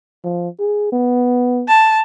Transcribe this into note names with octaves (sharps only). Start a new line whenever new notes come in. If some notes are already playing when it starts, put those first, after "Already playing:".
F3
G#4
B3
A5